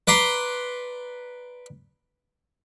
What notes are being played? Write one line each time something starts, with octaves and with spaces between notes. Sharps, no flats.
B4 D5 A#5 C6